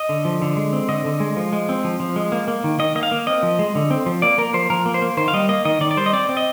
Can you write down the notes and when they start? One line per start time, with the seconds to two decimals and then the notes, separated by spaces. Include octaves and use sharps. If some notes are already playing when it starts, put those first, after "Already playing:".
Already playing: D#5
0.09 D3
0.25 F3
0.42 D3
0.57 G#3
0.73 C4
0.89 D3 D#5
1.05 D3
1.20 G#3
1.37 F3
1.53 G#3
1.69 C4
1.84 F3
2.00 F3
2.16 G#3
2.32 A#3
2.48 A#3
2.64 D#3
2.79 D#3 D#5
2.95 A#3 D#5
3.03 F5
3.11 A#3
3.27 C4 D#5
3.43 F3
3.59 G#3
3.75 D3
3.91 C4
4.06 F3
4.22 A#3 D5
4.38 A#3 A#4
4.54 F3 C5
4.70 F3 A#4
4.86 A#3
4.94 C5
5.02 A#3
5.17 D#3 C5
5.28 F5
5.34 G3 D#5
5.49 A#3 D#5
5.65 D#3 D#5
5.81 D#3 D5
5.91 D5
5.97 G3 C5
6.06 D#5
6.13 C4 D5
6.29 C4
6.37 D#5